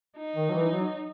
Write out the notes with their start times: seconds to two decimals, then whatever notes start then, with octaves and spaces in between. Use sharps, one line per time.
0.18 D#4
0.36 D#3
0.49 F#3
0.53 E3
0.71 F#3